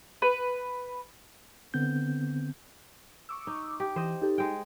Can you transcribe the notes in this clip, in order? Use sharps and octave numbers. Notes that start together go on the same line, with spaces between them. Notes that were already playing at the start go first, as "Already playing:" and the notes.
B4
D3 B3 C4 G6
C#6 D6 E6
D#4
G4
E3 C5 D#5
D#4 G4 A4
G#3 G5